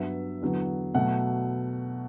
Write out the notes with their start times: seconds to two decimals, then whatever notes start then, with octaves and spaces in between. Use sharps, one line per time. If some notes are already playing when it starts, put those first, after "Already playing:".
Already playing: G2 F#3 B3 E5
0.42 E2 D3 F#3 B3
0.95 B2 F#3 A3 F#5